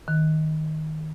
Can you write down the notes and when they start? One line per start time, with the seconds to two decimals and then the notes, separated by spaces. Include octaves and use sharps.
0.08 D#3